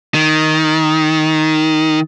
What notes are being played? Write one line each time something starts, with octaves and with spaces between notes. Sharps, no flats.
D#3